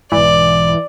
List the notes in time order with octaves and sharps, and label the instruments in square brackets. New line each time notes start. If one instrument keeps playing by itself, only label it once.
[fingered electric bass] B1 G#2 [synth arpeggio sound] E3 [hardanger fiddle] D5